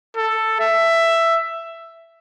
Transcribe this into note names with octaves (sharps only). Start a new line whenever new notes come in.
A4
E5